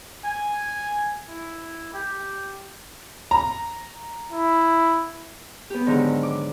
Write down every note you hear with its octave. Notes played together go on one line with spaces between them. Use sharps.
G#5
E4
G4
A#5
E4
B3 G4
G#2 D3 D#3 F#3
D6